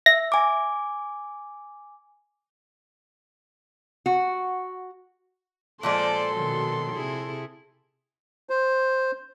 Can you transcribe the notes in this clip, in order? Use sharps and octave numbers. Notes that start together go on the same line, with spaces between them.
E5 A#6
G#5 D6
F#4
A#2 F3 G#3 A4 C5 D5 C6
B2 D#3 F#3
C3 E4 G#4
C5